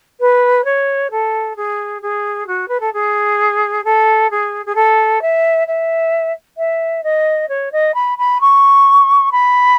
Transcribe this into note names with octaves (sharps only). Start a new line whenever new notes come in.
B4
C#5
A4
G#4
G#4
F#4
B4
A4
G#4
A4
G#4
G#4
A4
E5
E5
E5
D#5
C#5
D#5
B5
B5
C#6
B5